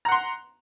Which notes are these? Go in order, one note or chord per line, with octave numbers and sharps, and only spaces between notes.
F#5 A#5 C6